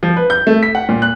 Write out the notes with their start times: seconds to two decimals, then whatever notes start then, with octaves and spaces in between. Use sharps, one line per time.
0.03 F3
0.16 B4
0.30 G6
0.47 A3
0.63 B6
0.75 F#5
0.89 A#2
1.02 F#6